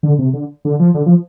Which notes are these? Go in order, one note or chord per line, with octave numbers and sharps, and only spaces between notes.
D3
C3
D3
D3
F3
D3
F3